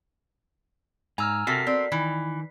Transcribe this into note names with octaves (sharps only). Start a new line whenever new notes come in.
G#2 G#5 A#5 E6 F6
C3 F#4 A4 A#4 B6 C7
C4 D5
D#3 E3